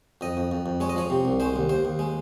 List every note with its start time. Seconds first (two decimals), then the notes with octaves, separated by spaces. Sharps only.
0.21 F2 D#5
0.37 F2
0.52 F2
0.66 F2
0.80 G#3 C#5
0.89 D#5
0.96 F3 C#5
1.10 C3
1.25 C2
1.40 G#3 C5
1.56 D#2
1.69 D#2 C5
1.85 D#2
1.99 G#3